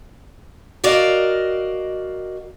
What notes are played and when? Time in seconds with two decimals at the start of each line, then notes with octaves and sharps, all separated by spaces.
0.84 F#4 A#4 D5 D#5 F5